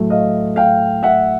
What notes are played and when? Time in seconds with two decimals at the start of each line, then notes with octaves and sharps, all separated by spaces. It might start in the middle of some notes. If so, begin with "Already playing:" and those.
Already playing: A2 F#3 A3
0.10 D#5 F5
0.56 F5 G5
1.03 E5 F#5